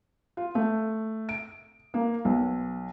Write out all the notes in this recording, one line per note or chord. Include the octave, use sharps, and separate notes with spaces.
F4
A3
D7
A#3
B1